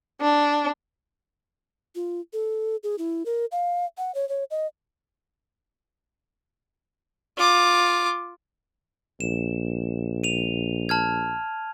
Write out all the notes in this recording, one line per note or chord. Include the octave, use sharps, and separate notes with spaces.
D4
F4
A4
G#4
E4
A#4
F5
F#5
C#5
C#5
D#5
F4 D6
A#1 E7
D#7 F7
A5 F6 G#6